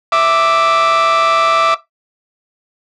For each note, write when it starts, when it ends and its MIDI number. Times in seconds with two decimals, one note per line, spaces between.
0.12 1.74 76
0.12 1.74 86